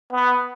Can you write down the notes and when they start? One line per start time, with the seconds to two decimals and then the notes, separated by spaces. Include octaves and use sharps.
0.13 B3